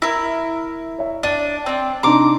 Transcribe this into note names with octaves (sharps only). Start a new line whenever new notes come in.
E4 A#4
C#5 E5
D4 D#7
C4 D4
C3 D4 D#4 A#5 C6 D6